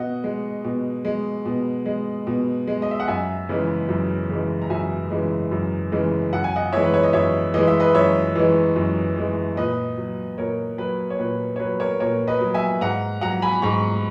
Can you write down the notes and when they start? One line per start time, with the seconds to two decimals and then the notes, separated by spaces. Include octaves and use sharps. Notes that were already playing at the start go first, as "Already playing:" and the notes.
Already playing: B2 D#5 F#5
0.24 G#3
0.64 B2
1.05 G#3
1.45 B2
1.86 G#3
2.27 B2
2.67 G#3
2.82 D#5
2.91 E5
3.00 F#5
3.07 F#2 E5 G#5
3.49 C#3 E3 G#3
3.89 F#2
4.30 C#3 E3 G#3
4.62 A#5
4.70 F#2 E5 G#5
5.11 C#3 E3 G#3
5.51 F#2
5.92 C#3 E3 G#3
6.33 F#2 F#5
6.44 G#5
6.56 D#5 F#5
6.73 E3 G#3 C#5 E5
6.84 B4
6.94 C#5
7.03 D#5
7.13 F#2 C#5 E5
7.54 E3 G#3 D#5
7.67 E5
7.80 B4 D#5
7.94 F#2 C#5 E5
8.35 E3 G#3
8.76 F#2
9.16 E3 G#3
9.57 A#2 B4 D#5
9.98 F#3
10.38 A#2 A#4 C#5
10.78 F#3 B4
11.10 C#5
11.19 A#2 B4
11.56 C#5
11.59 F#3 B4
11.80 A#4 C#5
12.00 A#2 A#4 C#5
12.27 B4 D#5
12.41 F#3
12.54 E5 G#5
12.81 G#2 F#5 A#5
13.21 F#3 F#5 A#5
13.42 G#5 B5
13.62 G#2 A#5 C#6